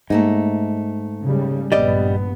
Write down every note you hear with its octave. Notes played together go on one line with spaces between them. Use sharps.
G#2 A3 A#3 D#4
C#3 G3
A#1 G2 G3 B3 D5 D#5